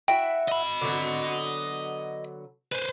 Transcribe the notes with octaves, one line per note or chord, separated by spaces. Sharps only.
E4 F#4 E5 G5
D#5 B5
D3 F#3 B3
B4 C5 G#5